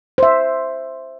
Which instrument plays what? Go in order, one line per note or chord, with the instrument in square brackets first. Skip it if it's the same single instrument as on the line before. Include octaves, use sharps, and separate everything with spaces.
[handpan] C5 E5